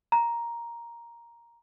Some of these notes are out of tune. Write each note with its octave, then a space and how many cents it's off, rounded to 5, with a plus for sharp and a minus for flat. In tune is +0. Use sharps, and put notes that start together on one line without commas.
A#5 +5